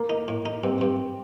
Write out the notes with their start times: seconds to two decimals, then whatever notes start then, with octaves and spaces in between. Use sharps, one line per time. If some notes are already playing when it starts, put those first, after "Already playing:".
Already playing: A#3 A4
0.10 D#4
0.28 A2
0.46 D#4
0.63 G2 C4
0.81 G2